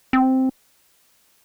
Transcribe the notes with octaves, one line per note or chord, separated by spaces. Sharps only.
C4